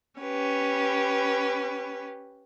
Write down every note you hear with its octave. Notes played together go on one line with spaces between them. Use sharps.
C#4 G4 B4